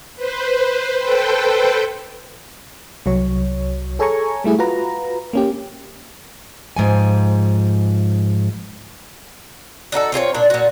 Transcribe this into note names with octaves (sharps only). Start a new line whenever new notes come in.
B4 C5
A4 B4 C5 G5
C2 F#3 C#5
G#4 A4 C#5 G#5 A#5 C#6
G3 A3 E4 G#4
F4 F#4 B4 A#5
A#3 C#4 G4
G#2 F3 G#5
D4 D#4 F#4 A4
C4 F4 G#4 C#5
A#2 D4
A#2 F#4